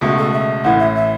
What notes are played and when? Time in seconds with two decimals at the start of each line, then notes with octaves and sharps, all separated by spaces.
0.01 C#2 B2 A3 F#4
0.17 A4
0.33 E5
0.64 A1 A2 E3 F#5
0.79 E5
0.96 E5